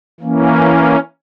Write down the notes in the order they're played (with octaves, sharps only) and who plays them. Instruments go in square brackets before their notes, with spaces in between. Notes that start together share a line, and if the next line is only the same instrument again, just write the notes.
[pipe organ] E3 A#3 C#4